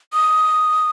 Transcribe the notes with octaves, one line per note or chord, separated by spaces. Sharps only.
D#6